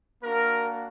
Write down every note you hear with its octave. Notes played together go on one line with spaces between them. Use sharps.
A#3 D4 F#4 A#4